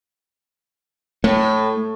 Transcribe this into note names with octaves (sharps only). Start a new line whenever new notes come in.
A2 A3